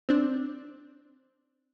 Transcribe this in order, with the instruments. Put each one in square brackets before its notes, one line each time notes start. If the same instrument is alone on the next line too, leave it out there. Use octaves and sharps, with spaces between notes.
[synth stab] C4 D4